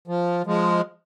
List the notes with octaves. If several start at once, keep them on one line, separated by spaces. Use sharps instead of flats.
F3
F3 G#3